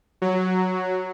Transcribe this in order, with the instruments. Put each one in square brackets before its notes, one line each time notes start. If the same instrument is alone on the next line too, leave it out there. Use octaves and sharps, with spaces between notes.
[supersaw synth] F#3